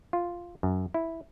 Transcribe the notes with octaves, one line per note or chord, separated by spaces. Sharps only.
F4
F#2
E4